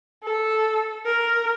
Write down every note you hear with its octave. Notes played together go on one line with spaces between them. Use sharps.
A4
A#4